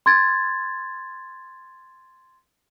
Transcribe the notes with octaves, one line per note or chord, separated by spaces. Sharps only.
C6 G#6 A6